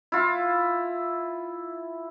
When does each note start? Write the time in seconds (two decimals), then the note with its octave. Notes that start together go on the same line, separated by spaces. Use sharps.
0.12 E4 F4